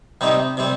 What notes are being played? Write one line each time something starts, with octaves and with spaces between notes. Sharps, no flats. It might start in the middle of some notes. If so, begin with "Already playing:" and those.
C3 G3 C4 D#4
C3 G3 C4